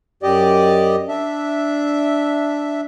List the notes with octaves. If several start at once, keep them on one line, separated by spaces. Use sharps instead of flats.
F#2 G4 D5 D#5
D4 E5